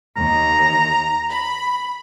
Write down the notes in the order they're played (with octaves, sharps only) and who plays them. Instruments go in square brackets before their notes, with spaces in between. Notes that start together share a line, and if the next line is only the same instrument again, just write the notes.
[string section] D#2 [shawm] A#5
[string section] B5